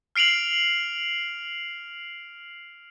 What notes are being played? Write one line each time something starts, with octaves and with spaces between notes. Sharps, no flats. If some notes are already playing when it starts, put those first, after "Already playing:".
F6 C7 D7 F7 F#7